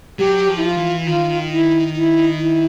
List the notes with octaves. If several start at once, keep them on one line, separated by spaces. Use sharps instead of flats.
F#3 G4
F3
E4
F4
E3
D#3 F4
E4
E4
E4